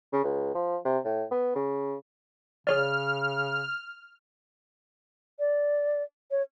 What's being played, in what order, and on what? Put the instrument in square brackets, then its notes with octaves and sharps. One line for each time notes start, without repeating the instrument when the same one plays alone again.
[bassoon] C#3
C#2
F3
C3
A2
B3
C#3
[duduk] C#3 [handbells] G#4 C#5 D5 [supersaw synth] F6
[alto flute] D5
C#5